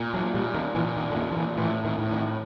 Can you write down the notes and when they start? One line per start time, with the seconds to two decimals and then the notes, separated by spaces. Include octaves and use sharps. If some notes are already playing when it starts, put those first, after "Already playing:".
Already playing: A#2
0.14 F#3
0.34 A#2 G3
0.55 D#3
0.75 A#2 E3
0.96 D#3
1.10 D3
1.16 A#2 D#3
1.31 F3
1.37 E3
1.57 A2 E3
1.85 D#3
1.98 A2
2.11 D#3